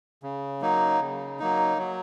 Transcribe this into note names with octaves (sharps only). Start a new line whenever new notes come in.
C#3
F#3 A#3 D#4
C#3
F#3 A#3 D#4
F#3